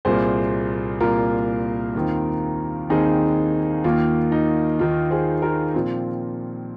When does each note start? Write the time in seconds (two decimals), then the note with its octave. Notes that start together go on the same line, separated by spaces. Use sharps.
0.05 C2 A#2 A#3 G#4 C5
1.00 C2 A#2 A#3 F4 A#4
1.95 D#2 D#3 C4
2.89 D#2 D#3 C4 D#4 G#4
3.84 D#2 D#3 A#3 F4
4.32 D#4
4.79 D#2 D#3 A#3 F4
5.10 G#4 C5
5.42 F4 A#4
5.74 A#2 F3 C4